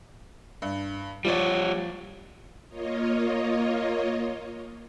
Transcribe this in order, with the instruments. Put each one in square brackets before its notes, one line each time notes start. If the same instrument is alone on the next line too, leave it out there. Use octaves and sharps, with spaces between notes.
[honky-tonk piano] G2
[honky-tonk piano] F3 D5 [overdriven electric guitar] G3 C#5
[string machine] A#3 F4 C#5 D#5